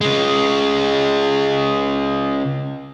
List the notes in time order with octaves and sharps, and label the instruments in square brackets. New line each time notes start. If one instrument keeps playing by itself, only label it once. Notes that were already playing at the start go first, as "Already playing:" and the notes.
[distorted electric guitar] C#3 G#3